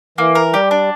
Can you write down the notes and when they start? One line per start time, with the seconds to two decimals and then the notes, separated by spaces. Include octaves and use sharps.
0.18 E3 A#3
0.35 A#4
0.53 G3 G4
0.71 D4